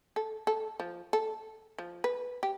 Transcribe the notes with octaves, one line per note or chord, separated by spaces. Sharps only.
A4
A4
F3
A4
F3
B4
G4